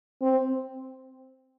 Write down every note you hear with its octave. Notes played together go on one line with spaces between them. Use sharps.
C4